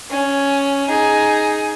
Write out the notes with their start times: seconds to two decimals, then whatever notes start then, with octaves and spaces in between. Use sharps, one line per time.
0.10 C#4
0.89 D#4 G#4